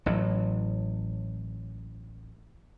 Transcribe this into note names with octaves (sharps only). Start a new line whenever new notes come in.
A1 A2 F#3